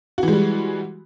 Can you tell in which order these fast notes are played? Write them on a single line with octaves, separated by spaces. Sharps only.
F#4 E3 G#3 G3